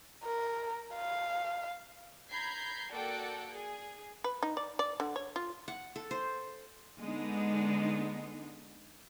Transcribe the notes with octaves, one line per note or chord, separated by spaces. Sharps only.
A#4
F5
A#5 B5 G6 G#6 C7
A#3 F#4 A4 D5 F#5 G5
G#4
B4
D#4
D5
D5
D3
C#5
F4
F#5
A4
C5
D3 G#3 B3 D4 D#4